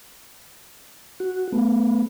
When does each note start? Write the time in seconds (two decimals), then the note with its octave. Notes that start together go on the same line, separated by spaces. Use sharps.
1.20 F#4
1.52 A3 B3